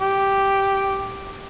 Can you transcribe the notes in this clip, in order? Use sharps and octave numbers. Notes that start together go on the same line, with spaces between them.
G4